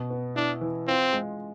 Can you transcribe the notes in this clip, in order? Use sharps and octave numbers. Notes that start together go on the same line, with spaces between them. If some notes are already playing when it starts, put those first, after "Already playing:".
Already playing: B2
B3
D4 E4
E3
C4 F4
G#3